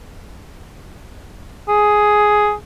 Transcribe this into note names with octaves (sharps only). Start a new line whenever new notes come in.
G#4